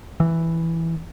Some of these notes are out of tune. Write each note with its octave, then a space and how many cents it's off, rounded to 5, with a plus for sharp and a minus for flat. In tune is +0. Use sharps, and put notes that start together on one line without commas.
E3 +0